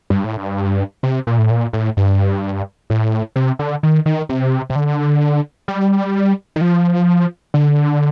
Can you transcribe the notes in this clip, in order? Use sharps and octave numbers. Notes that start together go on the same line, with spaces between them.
G2
A2
G2
C3
A#2
A2
A#2
A2
G2
A2
C3
D3
D#3
D#3
C3
C3
D3
G3
D#3
F3
D3